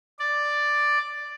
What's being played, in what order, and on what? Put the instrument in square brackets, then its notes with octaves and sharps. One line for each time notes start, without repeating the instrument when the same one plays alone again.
[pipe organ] D5